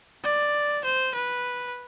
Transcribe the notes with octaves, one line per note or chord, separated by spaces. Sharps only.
D5
C5
B4